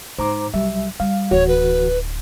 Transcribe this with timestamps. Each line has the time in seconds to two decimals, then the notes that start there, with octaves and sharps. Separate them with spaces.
0.18 G#2 C5 A#5 D6
0.54 C2 F#3 G3 E5
1.00 G3 F5
1.31 D1 D2 E3 F#4 C#5
1.48 B4